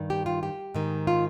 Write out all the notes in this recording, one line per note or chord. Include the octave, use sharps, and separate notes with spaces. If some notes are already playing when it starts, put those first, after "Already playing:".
Already playing: G2 D#3
G4
F4
G4
G#2 D#3
F4